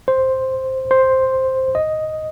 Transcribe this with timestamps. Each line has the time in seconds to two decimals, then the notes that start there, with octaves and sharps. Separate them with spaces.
0.08 C5
0.91 C5
1.75 D#5